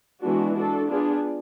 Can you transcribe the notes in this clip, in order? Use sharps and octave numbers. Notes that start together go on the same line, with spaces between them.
E3 G#3 B3 D4 F#4
D4 F#4 A4
B3 D4 F4 G#4